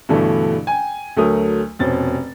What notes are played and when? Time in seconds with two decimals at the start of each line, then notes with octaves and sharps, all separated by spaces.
0.09 G2 B2 D3 E3 A3
0.67 G5 G#5
1.17 D2 F#3 A3 A#4 D#6
1.79 F1 B2 C#4 C5 A6